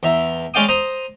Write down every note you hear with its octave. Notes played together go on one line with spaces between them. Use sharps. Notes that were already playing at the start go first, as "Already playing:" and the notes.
E2 E5 A#5
G#3 C#4 D5 F5 G5 D#6
C5 A#5 D#6